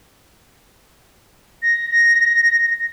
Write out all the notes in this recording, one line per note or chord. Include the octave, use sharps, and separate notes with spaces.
A#6